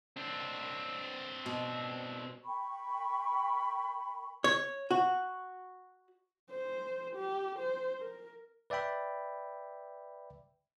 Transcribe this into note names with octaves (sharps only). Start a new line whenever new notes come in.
C4 D4
B2
A#4 G5 B5 C#6
C#5
F#4
C5
G4
C5
A#4
B4 D5 E5 G5 B5